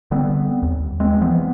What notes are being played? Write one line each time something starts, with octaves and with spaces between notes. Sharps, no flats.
D3 G3 B3 C4
D#2
G#3 C4
E3 F3 B3